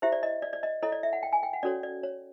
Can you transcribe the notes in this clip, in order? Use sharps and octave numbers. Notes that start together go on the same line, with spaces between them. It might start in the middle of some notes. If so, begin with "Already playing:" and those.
E4 G4 C5 E5
D5
D#5
D5
D5
D#5
E4 A4 C#5 D#5
D5
E5
F#5
G5
G#5
G5
F#5
C#4 F#4 A4 C#5 D5
D5
C#5